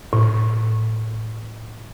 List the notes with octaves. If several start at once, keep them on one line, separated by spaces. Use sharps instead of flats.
A2